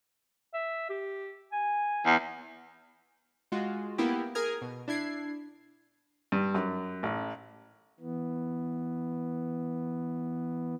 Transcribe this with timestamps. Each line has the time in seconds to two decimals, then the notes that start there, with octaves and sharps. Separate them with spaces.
0.54 E5
0.90 G4
1.52 G#5
2.06 E2
3.52 G#3 F4 F#4
3.98 A#3 B3 E4 G4
4.35 G#4 A#4 D#6 F6 G#6
4.62 B2
4.88 D4 E4 G#6 C7
6.32 G2
6.54 F#2
7.03 A1
8.00 E3 B3